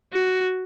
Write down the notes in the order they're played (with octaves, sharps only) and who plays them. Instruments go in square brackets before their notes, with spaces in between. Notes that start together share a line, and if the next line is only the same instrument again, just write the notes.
[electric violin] F#4